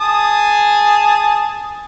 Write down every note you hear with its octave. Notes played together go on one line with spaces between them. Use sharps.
G#4 A5 D#6